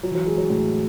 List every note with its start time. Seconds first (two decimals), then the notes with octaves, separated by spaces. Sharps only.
0.03 F#3
0.11 E3
0.15 F#3
0.27 G#3
0.38 F#3
0.50 A2